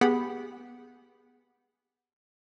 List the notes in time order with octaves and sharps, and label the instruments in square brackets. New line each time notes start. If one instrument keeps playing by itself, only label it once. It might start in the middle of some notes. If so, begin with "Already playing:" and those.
[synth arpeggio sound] B3 G4 G#4 F#5 B5